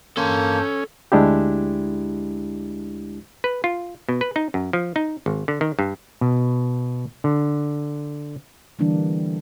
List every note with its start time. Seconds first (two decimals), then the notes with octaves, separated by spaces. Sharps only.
0.17 G2 A#3 C#4 A4 A5 C6 G6
1.12 D2 G#3 D4 E4 G4
3.44 B4
3.64 F4
4.09 B2
4.21 B4
4.36 D#4
4.54 F#2
4.73 F3
4.96 D#4
5.26 G#1
5.48 D3
5.61 D#3
5.79 G2
6.21 B2
7.24 D3
8.79 D3 E3 G3 A#3 D4